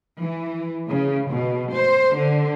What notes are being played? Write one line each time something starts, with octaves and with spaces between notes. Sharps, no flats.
E3
C#3
B2
C5
D3